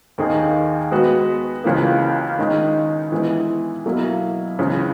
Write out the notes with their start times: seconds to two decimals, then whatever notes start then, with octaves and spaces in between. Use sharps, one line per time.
0.18 D#2 D#3 A#3 D#4 G#4
0.91 G#3 B3 F#4 B4
1.64 C#2 C#3 E3 A#3
2.39 D#3 G#3 D#4
3.12 E3 G#3 B3 E4
3.85 B2 F#3 A#3 E4
4.59 C#2 C#3 E3